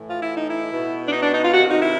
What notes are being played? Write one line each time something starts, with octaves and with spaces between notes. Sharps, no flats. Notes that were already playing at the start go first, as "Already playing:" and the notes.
Already playing: A2 E3
F4
E4
D#4
E4
B2
D4
D#4
D4
D#4
F4
C3 D#3 F#4
D#4
E4